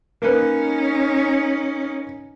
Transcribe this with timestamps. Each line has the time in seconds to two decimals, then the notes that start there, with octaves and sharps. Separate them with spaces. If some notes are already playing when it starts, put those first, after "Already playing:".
0.22 A#3 C#4 D#4 B4